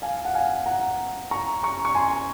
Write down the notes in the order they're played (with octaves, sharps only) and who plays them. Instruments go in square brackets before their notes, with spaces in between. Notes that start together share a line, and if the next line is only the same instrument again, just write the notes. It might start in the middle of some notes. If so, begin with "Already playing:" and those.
[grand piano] F5 G#5
F#5
F5 G#5
F#5 A#5
A#5 C#6
A#5 C#6
C#6
G#5 C6